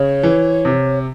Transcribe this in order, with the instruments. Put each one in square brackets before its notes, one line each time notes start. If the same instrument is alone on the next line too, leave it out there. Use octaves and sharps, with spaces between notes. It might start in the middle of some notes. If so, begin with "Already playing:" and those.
Already playing: [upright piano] C#3 [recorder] C#5
[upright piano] E3
C3